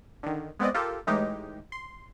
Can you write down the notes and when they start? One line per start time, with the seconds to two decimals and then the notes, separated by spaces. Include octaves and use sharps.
0.23 D3 D#3
0.60 G#3 B3 C4 D5 D#5
0.74 F4 G4 A4 A#4
1.07 A2 E3 G#3 D#4 G4
1.72 C6